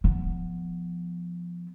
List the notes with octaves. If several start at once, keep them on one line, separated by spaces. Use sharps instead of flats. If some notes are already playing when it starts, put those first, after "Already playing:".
F3 B3